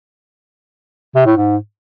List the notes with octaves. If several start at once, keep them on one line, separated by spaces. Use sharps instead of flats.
C3
A2
G#2